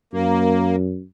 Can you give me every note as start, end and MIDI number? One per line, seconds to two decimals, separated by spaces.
0.13 1.03 42
0.13 0.76 58